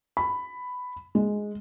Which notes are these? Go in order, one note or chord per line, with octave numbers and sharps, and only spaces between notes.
B5
G#3